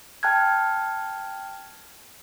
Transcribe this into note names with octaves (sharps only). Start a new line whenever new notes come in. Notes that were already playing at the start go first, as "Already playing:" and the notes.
G5 A5 F6 F#6 G#6